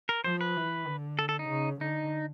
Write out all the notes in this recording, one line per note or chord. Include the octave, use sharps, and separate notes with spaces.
A#4
F3 C5
B4
E3
D3
A4
A4
D#4
C#3
D3 D#4